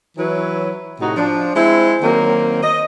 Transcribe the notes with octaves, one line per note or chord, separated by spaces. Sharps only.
E3 F#3 E4 B4 C#5
A2 C3 D#4 F#4
F3 D4
G#3 C4 E4
D#3 F#3 A#3 C4
D#5